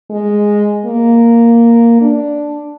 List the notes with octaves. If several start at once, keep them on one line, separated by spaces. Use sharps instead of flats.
G#3
A#3
D4